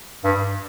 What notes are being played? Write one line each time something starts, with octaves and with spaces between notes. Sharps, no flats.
G2